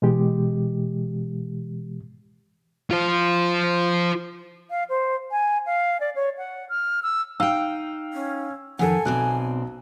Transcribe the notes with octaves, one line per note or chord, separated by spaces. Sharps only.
B2 E3 G#3 G4
F4 C5
F5
C5
G#5
F5
D5
C#5
F#5
F6
E6
D#4 F5 G5 E6
C#4
F2 D#3 A4 F#5 G#5
B1 B2 C4 D5 F#6